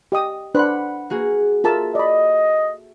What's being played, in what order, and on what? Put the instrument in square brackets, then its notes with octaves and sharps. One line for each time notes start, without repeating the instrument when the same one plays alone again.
[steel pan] G4 D#5 D#6
[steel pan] D4 B4 C5 [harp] F#5 B5 F#6
[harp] A#3 F#4 G#4
[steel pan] F4 A#4 A5 [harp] A4 E5
[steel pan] D5 B5 [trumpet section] D#5